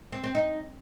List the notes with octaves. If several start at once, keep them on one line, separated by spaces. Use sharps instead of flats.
C4
C4
D#4